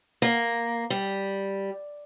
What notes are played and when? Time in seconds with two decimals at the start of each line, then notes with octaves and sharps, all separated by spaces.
0.22 A#3
0.90 G3